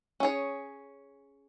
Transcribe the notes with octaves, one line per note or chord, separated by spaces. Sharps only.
C#4 G#4 C#5